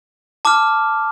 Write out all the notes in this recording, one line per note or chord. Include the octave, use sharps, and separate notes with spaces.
A5 D6 F6